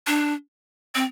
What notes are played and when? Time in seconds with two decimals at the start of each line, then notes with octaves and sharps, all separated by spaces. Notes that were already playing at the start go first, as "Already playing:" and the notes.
0.07 D4
0.95 C4